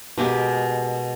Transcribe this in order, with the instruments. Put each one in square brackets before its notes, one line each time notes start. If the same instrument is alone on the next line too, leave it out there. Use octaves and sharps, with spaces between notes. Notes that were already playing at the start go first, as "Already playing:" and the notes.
[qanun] B2 G#3 G4 A#4